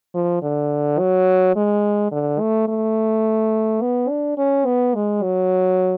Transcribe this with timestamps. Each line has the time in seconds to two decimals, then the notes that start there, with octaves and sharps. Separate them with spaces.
0.15 F3
0.42 D3
0.99 F#3
1.56 G#3
2.12 D3
2.40 A3
2.68 A3
3.81 B3
4.09 D4
4.37 C#4
4.65 B3
4.95 G#3
5.22 F#3